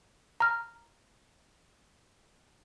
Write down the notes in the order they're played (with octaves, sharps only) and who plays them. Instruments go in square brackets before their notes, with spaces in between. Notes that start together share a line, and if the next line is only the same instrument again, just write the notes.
[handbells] A#5 F6